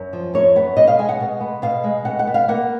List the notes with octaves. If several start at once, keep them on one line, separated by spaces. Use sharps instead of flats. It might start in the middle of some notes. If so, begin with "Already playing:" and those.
Already playing: F#2
F3
F#2 C#5
B3
B2 D#5
F5
G#3 G#5
F#5
B2
B3
B2 F5
G#3
B2 F#5
F#5
B3
F5
A#3 F#5